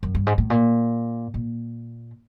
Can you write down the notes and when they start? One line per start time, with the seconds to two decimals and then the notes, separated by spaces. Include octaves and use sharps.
0.03 F#2
0.15 G2
0.27 G#2
0.38 A2
0.50 A#2
1.34 A#2